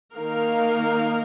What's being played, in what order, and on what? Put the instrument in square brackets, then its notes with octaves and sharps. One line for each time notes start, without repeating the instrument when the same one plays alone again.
[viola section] D#3 A#3 D#4 A#4 F5